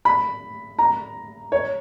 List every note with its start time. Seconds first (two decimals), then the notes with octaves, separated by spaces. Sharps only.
0.05 B5
0.79 A#5
1.52 C#5